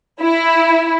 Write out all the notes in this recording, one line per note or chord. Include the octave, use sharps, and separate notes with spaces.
E4